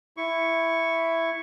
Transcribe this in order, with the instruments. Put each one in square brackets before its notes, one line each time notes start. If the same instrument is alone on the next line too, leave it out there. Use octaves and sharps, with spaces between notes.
[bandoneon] E4 C#6